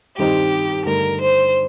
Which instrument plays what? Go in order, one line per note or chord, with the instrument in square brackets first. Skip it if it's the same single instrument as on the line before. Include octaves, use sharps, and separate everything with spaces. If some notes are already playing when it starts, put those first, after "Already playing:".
[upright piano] G2 D#3 G3 C4 D#4 [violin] G4
[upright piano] G2 D3 A3 D#4 [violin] A#4
[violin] C5